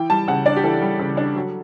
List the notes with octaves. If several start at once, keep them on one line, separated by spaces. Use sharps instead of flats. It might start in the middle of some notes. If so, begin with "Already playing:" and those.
Already playing: E3 G5
G3 A5
C#3 F#5
D4 D5
G4
E3 A4
G3
C#3
D4
F#3